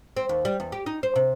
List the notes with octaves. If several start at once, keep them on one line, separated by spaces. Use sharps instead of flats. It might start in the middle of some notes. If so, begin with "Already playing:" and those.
C4
D#2
G3
E2
G4
D#4
C5
C3